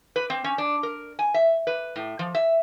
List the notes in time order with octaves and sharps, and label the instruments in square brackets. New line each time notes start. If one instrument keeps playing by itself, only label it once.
[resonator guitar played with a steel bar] B4
C4
C#4
D4
A#4
G#5
E5
B4
A2
F3
E5